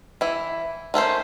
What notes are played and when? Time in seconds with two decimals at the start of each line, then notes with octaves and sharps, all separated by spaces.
0.21 E3 E4
0.94 D#3 A3 C#4 C5